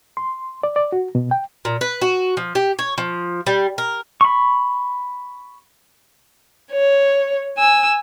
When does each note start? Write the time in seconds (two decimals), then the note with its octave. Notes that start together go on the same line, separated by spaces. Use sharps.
0.17 C6
0.63 D5
0.76 D5
0.92 F#4
1.15 B2
1.31 G5
1.65 A#2
1.81 B4
2.01 F#4
2.37 F3
2.55 G4
2.79 C#5
2.98 F3
3.47 G3
3.78 A#4
4.21 B5 C#6
6.72 C#5
7.58 G#5 E6